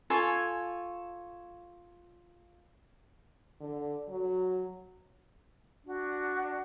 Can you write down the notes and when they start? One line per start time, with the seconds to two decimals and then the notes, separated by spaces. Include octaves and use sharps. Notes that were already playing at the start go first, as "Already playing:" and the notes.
0.10 F4 A4 C#5 G#5
3.61 D3
4.09 F#3
5.85 D4 F#4